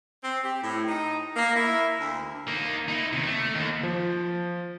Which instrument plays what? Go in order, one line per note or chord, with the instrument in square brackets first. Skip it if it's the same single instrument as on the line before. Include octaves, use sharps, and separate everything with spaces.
[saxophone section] C4
G4
A2
D#4
A#3
E4
D2
[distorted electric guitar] A#3 D#4
D#4 E4
D#2 C3
A3
D#2
[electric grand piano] F3